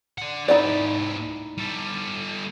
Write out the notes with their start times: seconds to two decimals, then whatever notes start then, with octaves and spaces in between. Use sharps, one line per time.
0.18 D4 F#5
0.48 G#2 D#4 E4 G4 D5
1.58 G3 A4